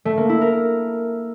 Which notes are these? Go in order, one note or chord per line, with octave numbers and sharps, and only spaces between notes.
A3
A#3
E4
A#4